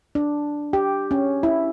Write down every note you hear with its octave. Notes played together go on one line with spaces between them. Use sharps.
D4
G4
C#4
E4